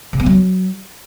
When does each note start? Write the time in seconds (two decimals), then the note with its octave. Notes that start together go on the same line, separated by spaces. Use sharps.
0.13 C#3
0.20 B3
0.26 F#3